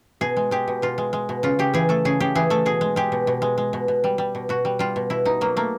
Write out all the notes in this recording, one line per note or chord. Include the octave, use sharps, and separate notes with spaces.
B2 G#4
G#3
G#3 G4
B2
B2 F4
G#3
G#3
B2
C#3 F4
C#3 G4
E3 G#4
A3 A4
C#3 G#4
C#3 G4
E3 G#4
A3 A4
B2 G#4
G#3
G#3 G4
B2
B2
G#3
G#3
B2
B2
G3
G3
B2
B2 F#4
G3
G3 F4
B2
B2 E4
B2 D#4
F#3 A#3
A3 A#3